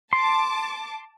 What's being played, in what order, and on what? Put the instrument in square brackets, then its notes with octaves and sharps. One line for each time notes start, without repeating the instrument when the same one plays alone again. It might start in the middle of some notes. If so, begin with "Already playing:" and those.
[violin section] A5 D6 [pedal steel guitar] C6